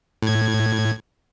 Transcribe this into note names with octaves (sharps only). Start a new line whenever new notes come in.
A2 G#6